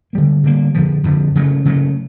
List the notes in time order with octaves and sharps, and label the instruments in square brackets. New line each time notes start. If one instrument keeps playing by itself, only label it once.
[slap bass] D3 G3 A#3
D3 G3 A#3
F2 D3 F3
F2 D3 F3
C#3 F#3 A3
C#3 F#3 A3